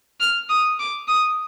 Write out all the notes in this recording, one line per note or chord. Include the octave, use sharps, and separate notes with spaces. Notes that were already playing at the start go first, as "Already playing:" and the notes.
F6
D#6
D6
D#6